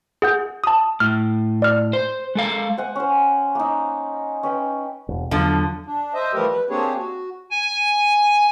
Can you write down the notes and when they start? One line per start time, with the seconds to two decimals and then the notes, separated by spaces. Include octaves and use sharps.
0.22 G#4 F#5 G6
0.64 A5 D#6
1.00 A2 F6
1.62 D5 F6
1.93 C5
2.35 G#3 A4 F5
2.78 C5 F#5 G#5
2.96 C#4 C5
3.55 A#3 D#4
4.43 C#4 B4 G5
5.08 E1
5.31 E2 D3 F3 F#3
5.86 D4
6.14 C5 D#5 E5
6.33 E3 F3 G3 A3 G4 A#4
6.51 B4
6.70 A#3 C4 D4 G4 G#4 C#5
6.96 F#4
7.51 G#5